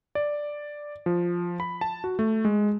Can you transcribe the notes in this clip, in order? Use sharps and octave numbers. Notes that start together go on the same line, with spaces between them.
D5
F3
B5
A5
F#4
A3
G#3